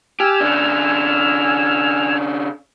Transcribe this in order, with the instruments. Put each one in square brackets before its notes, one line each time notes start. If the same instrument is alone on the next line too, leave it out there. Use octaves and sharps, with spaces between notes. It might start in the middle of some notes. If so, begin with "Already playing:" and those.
[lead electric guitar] G4 [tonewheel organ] G#5 E6 F6
[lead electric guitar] C#3 D4